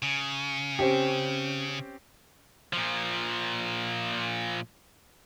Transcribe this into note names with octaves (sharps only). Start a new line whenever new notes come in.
C#3
C4 C#4 G4
A#2 F3